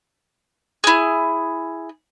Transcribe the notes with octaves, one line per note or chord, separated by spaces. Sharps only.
E4 G#4